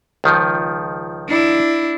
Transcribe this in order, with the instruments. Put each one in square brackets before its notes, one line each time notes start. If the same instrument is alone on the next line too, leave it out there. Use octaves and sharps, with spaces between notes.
[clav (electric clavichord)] C#2 D#3 F3
[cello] D4 E4